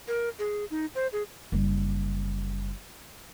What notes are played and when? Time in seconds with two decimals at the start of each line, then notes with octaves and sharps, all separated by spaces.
0.08 A#4
0.39 G#4
0.71 D#4
0.95 C5
1.13 G#4
1.52 F#1 G3